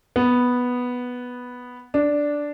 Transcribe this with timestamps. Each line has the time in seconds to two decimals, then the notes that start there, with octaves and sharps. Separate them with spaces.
0.16 B3
1.94 D4